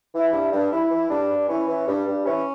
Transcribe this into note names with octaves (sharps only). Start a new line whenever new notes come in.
E3
E4
G2
G2
E3 E4
E3
G2 D4
G2
E3 C#4
E3
G2 G3
G2
E3 C#4